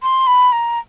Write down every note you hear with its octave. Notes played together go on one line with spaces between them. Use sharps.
C6
B5
A#5